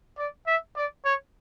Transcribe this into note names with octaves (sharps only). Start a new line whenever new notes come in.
D5
E5
D5
C#5